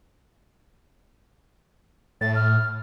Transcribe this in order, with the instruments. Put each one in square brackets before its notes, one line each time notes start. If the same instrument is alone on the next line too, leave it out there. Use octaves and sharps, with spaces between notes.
[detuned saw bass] A2 [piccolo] A6
[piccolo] F6